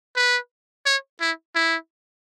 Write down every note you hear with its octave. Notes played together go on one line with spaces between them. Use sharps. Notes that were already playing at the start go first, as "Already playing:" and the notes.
B4
C#5
E4
E4